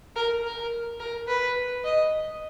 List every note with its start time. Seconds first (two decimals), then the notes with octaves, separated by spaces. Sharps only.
0.16 A#4
0.44 A#4
1.00 A#4
1.28 B4
1.84 D#5